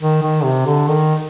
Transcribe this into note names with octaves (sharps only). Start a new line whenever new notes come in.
D#3
D#3
C3
D3
D#3